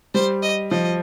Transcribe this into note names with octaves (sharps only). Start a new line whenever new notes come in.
G3 C5
D#5
F3 D#5